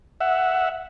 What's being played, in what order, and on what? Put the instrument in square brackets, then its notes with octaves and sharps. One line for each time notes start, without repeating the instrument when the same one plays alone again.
[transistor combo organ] E5 F#5